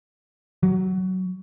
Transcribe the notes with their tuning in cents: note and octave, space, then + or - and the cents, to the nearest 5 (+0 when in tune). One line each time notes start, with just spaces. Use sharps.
F#3 +15